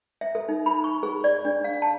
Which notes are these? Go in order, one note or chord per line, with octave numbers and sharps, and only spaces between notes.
E5
A4
D#4
B5
C#6
G#4
D5
D4
F5
A5